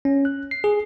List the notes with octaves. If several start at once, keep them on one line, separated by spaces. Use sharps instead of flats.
C#4
F#6
C7
G#4